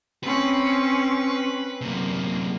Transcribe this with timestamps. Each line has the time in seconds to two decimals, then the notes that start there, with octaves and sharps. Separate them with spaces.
0.23 C4 C#4 B4
1.81 F#2 C3 A#3